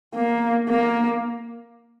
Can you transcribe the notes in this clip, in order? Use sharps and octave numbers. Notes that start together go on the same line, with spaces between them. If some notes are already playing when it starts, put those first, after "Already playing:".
A#3
A#3